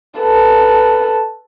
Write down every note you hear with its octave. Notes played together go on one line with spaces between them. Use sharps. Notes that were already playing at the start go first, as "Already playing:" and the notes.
A4 B4